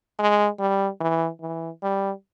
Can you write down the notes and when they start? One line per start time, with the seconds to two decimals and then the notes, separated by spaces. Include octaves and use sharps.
0.19 G#3
0.59 G3
1.00 E3
1.41 E3
1.82 G3